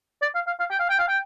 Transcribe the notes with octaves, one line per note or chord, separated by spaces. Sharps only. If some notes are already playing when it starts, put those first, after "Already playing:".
D5
F5
F5
F5
G5
F5
G5
F5
G5